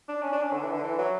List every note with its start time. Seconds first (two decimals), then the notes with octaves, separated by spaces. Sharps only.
0.08 D4
0.22 C#4
0.33 D4
0.43 C#4
0.53 D3
0.64 E3
0.73 D3
0.83 E3
0.99 F#3